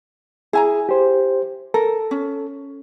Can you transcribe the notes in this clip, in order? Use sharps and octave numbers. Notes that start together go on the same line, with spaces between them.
E4 G#4 G#5 A#5
G4 C5
A4 A#4
C#4